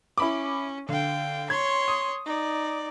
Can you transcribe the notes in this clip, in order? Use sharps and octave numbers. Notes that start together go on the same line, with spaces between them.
C#4 E4 B5 D6
D3 F5 G5
C#5 C6 G#6
D#6
D#4 D5